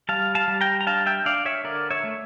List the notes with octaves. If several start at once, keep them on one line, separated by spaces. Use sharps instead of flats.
G3 F5 A5
F5 A5
G3
G5 A#5
A#5
D4 F5 A5
E5 G5
D4 D5 F5
C#5 E5
D3 A#4 D5
C#5 E5
A3